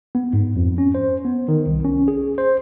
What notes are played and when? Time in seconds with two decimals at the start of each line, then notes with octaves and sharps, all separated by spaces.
0.15 B3
0.33 G#2
0.56 F2
0.78 C#4
0.95 C5
1.25 B3
1.48 D#3
1.67 C2
1.85 C#4
2.08 G#4
2.38 C5